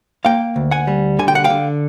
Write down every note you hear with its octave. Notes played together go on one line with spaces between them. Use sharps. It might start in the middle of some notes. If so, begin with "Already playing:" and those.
A#3 F5 G5
D2
F#5 G#5
G3
D3 G#5
G5
F#5
F5 G5
D3